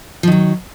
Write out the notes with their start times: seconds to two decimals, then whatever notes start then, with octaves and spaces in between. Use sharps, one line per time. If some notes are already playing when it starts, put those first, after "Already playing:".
0.23 F3
0.27 D#3
0.32 F#3